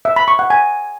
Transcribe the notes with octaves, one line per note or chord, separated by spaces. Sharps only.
E5
B5
C#6
F#5
G#5